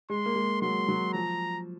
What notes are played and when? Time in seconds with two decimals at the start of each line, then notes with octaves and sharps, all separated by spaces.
0.10 G#3 C6
0.26 A#3
0.36 G#3
0.61 F#3 C6
0.88 F#3
1.13 F3 A#5